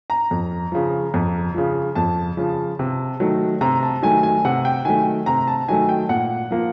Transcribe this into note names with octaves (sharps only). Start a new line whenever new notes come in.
A#5
F2
C#3 F3
F2
C#3 F3
F2 A5
C#3 F3
C3
D#3 F#3 A3
C3 A#5
A5
D#3 F#3 A3 G#5
G#5
C3 F#5
G5
D#3 F#3 A3 G#5
C3 A#5
A5
D#3 F#3 A3 G#5
G5
A#2 F#5
F3 A#3